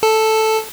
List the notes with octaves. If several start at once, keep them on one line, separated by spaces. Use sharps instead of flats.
A4